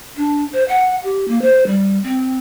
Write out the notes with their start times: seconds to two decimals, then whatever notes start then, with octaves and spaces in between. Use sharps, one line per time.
0.17 D4
0.52 C5
0.68 F#5
1.04 G4
1.28 A#3
1.42 C5
1.67 G3
2.04 C4